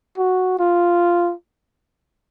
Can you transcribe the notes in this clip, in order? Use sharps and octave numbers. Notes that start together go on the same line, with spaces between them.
F#4
F4